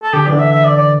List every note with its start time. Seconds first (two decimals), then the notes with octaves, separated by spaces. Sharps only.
0.03 A4
0.14 D3 G4
0.27 E3 D5
0.33 D3
0.39 E5
0.52 E5
0.65 D5
0.77 D5